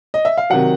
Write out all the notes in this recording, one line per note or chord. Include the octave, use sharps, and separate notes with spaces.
D#5
E5
F5
C3 D#3 F#3 F#5